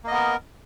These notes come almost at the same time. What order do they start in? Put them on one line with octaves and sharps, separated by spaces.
A#3 D#5 B3 A#4